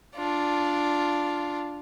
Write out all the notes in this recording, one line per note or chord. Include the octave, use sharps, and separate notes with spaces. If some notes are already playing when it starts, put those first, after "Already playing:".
D4 F4